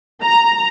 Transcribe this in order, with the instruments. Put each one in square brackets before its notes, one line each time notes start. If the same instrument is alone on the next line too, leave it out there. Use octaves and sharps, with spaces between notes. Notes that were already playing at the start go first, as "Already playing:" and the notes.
[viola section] A#5